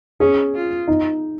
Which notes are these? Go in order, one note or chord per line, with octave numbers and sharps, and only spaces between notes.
C#4 G#4
F4
D#4